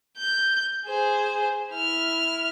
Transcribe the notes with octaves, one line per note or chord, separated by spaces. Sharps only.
G6
G#4 C5
E4 F6